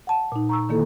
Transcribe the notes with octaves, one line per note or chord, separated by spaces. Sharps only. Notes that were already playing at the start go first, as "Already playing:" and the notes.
F#5 A5
A#2 D#4
A#5 C#6 E6
D3 D#3 A#3 E4 A4